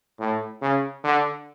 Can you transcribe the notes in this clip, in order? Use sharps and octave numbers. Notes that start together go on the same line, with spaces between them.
A2
C#3
D3